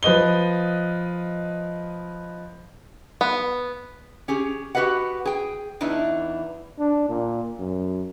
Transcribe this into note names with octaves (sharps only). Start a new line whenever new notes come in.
F3 B4 D#5 G7
B3
C#4 G4 G#4
F#4 G4 B4 D#5 F#5
G#4 G5
E2 E3 D4 D#4
D4
A#2
F#2